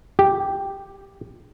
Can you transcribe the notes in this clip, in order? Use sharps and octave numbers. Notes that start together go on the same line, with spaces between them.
G4